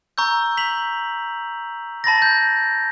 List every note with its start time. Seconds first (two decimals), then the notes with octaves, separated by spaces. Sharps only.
0.18 A#5 C#6 E6 G6
0.57 B6 F7 F#7
2.04 A5 B5 A6 A#6
2.22 G6